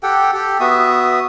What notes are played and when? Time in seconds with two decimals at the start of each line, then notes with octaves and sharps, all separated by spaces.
0.03 G4 A4 F#5 G5
0.34 G4 A4
0.60 B3 F#4 E5 D#6